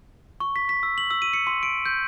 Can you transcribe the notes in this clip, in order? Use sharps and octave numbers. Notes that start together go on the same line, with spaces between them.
C#6
B6
B6
E6
F#7
E6
D#7
C#7
C6
D7
G6